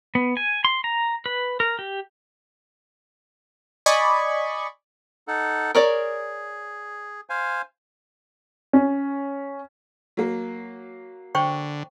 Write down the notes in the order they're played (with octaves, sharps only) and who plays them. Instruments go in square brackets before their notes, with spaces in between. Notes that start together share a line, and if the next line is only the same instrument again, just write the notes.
[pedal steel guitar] B3
G#5
C6
A#5
B4
A#4
G4
[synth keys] D5 D#5 G#5 B5 C#6
[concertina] D#4 A4 F#5
[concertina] G#4 [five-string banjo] A#4 C#5 D5
[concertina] C5 F5 G#5
[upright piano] C#4
[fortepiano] F#3 A#3
[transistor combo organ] D3 [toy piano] C5 G5 C#6